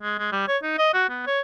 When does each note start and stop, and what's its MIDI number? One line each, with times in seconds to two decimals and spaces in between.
0.02 0.17 56
0.19 0.27 56
0.32 0.47 55
0.48 0.57 73
0.63 0.78 63
0.78 0.89 75
0.94 1.07 66
1.09 1.25 59
1.27 1.40 73